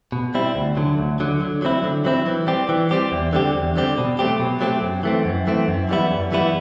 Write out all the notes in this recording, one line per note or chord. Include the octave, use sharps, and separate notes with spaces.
B2
G3 C4 E4
D2
D3 F#3
D2
D3 F#3
D3
F#3 C4 E4
D3
F#3 C4 E4
E3
G3 C4 G4
E3
G3 C4 G4
E2
D3 G3 C4 G4
E2
D3 G3 C4 G4
B2
F#3 A3 C4 G4
B2
F#3 A3 C4 G4
F#2
E3 A3 C4
F#2
E3 A3 C4
F#2
E3 G3 B3 E4
F#2
E3 G3 B3 E4